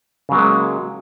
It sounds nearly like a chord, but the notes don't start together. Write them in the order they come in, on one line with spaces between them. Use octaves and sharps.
C#3 F#3 A#3 G#3